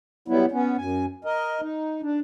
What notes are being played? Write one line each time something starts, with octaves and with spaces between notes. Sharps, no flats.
F#3 G3 B3 E4
B3 C#4
F#2 G#5
A#4 D#5
D#4
D4